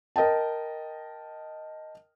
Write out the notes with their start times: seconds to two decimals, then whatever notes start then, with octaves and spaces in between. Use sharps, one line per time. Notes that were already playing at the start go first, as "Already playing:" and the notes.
0.16 A#4 D#5 G5 A5